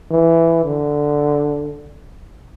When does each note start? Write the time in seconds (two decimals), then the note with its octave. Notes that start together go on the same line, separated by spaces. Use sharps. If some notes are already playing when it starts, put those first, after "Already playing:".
0.11 E3
0.64 D3